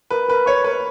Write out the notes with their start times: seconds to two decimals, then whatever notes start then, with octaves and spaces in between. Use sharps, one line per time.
0.11 A#4 B4
0.29 A#4 B4
0.46 C#5 C#6
0.64 A#4 B4